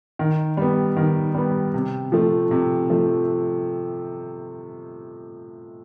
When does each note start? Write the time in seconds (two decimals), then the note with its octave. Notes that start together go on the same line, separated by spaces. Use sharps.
0.19 D#3
0.57 G3 B3
0.97 D#3
1.35 G3 B3
1.74 C3
2.12 F3 A3
2.51 C3
2.90 F3 A3